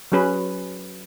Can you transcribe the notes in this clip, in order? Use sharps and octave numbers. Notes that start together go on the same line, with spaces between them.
F#3 C#4 G#4 B4